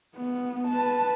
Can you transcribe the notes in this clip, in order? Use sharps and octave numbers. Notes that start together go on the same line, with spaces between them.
B3
B4 A5